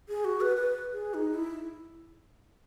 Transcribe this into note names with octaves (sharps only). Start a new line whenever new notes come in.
G#4
F#4
B4
B4
G#4
D#4
E4